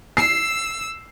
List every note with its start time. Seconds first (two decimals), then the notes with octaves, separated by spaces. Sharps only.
0.17 E6 C7